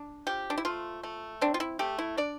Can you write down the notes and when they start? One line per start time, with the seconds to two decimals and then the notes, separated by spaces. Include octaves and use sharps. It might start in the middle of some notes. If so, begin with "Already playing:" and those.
Already playing: D4
0.27 F3 G4
0.50 D4
0.58 E4
0.65 A3 F4
1.03 A3
1.41 C4 D4
1.54 F4
1.60 E4
1.79 A3 G4
1.98 E4
2.18 D4 D5